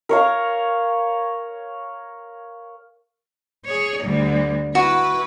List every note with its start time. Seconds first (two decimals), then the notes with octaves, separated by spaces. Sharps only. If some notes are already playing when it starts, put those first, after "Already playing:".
0.09 A#4 C#5 F5
3.65 G#4 C#5
4.04 D2 G3
4.75 E4 F#4 B4